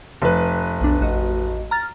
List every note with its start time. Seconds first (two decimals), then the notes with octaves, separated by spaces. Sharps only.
0.22 F1 B4
0.81 B1 D4
1.01 A1 F#4 D#5
1.71 A#5 F6 A6